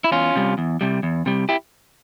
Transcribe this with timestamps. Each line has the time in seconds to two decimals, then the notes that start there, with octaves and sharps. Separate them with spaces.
0.04 E4
0.12 E2 C#4 F4
0.35 C3 G3
0.58 E2
0.81 C3 G3
1.03 E2
1.26 C3 G3
1.49 E4 G4